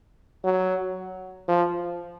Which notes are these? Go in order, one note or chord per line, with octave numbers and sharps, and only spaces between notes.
F#3
F3